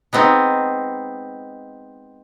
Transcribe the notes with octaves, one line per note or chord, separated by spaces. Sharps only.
G#3 B3 C4 D#4